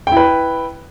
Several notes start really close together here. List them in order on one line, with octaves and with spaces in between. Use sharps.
G5 E4 B4